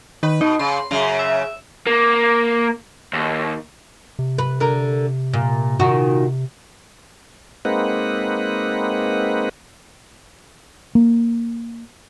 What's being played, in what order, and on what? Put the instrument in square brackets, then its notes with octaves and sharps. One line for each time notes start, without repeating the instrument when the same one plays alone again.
[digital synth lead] D#3 [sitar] B4
[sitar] B2 [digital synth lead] D#4
[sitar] C#3 [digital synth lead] C6
[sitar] F#2 C#3
[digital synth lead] E5
[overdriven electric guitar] A#3
D#2
[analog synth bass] C3
[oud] B4
D3 A#4
A#2
A#2 D#3 F#4
[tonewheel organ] G#3 A#3 C4 D#4 B4 F#5
[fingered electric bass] A#3